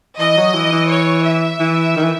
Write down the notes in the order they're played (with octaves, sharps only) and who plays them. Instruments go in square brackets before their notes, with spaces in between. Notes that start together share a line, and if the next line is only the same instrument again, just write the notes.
[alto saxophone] E3 [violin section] D#5
[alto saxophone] F#3
E3
E3
[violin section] C#5
E5
[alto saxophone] E3
D#3
E3